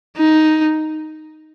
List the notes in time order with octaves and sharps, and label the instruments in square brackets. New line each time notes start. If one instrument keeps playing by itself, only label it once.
[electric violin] D#4